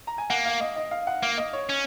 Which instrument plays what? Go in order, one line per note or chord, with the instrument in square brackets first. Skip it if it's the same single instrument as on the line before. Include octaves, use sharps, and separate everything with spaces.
[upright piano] A#5
G#5
[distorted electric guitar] A#3 [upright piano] F#5
[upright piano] F5
D#5
D#5
F5
F#5
[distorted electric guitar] A#3 [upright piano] F5
[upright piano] D#5
C#5
[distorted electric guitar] C#4